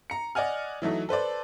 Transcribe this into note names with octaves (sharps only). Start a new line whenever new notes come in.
A#5 C#7
D5 D#5 F#5 G#5 F6
E3 F#3 A3 D#4
A4 B4 C5 D5